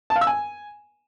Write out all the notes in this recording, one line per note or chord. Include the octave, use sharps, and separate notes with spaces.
A5
F5
E6
G#5